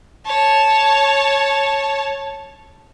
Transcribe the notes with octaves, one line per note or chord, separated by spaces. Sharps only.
C#5 A5